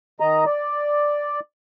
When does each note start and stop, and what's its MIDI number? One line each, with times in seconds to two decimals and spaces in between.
0.20 0.44 51
0.20 0.44 75
0.20 0.44 82
0.46 1.40 74